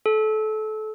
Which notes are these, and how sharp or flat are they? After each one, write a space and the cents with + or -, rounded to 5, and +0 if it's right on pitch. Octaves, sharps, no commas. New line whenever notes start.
A4 -25